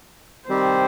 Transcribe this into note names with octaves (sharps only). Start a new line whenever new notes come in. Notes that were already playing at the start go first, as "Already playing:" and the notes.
D#3 G3 C4 G4 C5